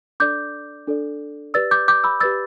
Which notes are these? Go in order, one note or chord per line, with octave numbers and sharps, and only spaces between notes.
D4 A4 D5 D6 G6
D4 A4 D5
G4 B4 D5 E6 A6
D6 G6
D6 G6
B5 E6
G4 B4 D5 E6 A6